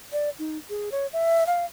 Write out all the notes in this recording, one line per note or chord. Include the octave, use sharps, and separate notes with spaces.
D5
D#4
G#4
C#5
E5
F5